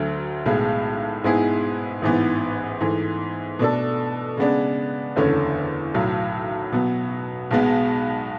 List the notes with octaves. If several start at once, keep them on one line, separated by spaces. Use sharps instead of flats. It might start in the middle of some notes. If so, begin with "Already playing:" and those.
Already playing: D2 D3 F#3 A3
B1 A2 G#3 B3
G#2 G#3 B3 E4 G#4
A1 G#2 E3 B3
G#2 E3 A3
B2 A3 D4 A4
C#3 G#3 B3 D4
F#1 E2 D3 A3 C#4
B1 A2 F#3
B2 F#3 B3
B1 B2 G#3 B3